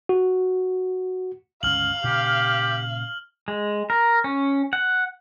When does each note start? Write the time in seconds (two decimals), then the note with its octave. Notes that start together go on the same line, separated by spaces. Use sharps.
0.09 F#4
1.63 G1 C#2 C#4 F5 F6 F#7
2.04 A#2 C#3 G4
3.48 G#3
3.90 A#4
4.24 C#4
4.73 F#5